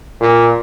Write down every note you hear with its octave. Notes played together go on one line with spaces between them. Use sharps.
A#2